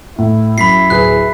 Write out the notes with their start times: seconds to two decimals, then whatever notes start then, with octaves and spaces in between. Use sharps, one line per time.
0.18 A2 E4
0.58 F#2 B5 B6 C7
0.90 D1 G#4 B4 F#6